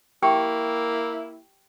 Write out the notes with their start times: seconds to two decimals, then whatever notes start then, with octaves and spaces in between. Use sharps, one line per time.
0.22 A#3 E4 G4 G5 C#6